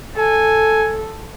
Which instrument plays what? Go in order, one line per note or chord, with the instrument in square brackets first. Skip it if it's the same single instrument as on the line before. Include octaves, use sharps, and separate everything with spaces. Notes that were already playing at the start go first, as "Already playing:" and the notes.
[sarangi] A4 [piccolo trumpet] G#5